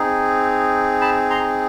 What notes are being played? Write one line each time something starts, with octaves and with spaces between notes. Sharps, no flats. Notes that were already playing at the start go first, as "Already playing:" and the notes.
Already playing: C4 D#4 G#4
A5 B5
A#5 C6